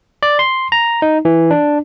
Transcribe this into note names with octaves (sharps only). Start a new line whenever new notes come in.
D5
C6
A#5
D#4
E3
D4